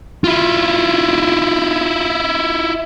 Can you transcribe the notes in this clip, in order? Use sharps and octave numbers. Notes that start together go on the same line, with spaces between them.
E4 F4